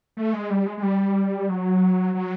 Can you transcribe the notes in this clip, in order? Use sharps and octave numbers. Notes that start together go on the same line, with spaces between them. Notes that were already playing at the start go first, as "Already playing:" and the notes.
A3
G#3
G3
G#3
G#3
G3
F#3
F#3